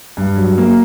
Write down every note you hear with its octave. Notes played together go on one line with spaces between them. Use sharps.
G2
F#3
A#3